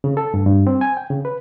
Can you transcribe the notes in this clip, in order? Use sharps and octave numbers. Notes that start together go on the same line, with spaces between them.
C#3
A4
G2
G2
C4
G#5
G5
C#3
B4